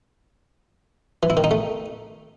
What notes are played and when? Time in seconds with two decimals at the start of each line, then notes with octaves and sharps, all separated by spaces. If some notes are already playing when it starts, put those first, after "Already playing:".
1.23 E3
1.30 E4
1.37 D#3
1.44 D#4
1.51 A3